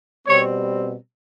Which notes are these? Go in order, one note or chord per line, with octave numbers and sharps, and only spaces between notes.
B2 G3 C4 C#5